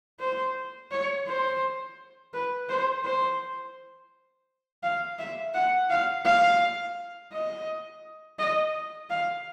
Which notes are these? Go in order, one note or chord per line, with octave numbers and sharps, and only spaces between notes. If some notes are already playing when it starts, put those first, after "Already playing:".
C5
C#5
C5
B4
C5
C5
F5
E5
F#5
F5
F5
D#5
D#5
F5